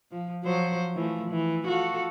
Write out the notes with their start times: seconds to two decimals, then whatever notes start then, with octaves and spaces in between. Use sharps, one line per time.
0.11 F3
0.43 F3 F#3 C5
0.95 E3 F3 A3
1.31 E3
1.66 F4 F#4 A4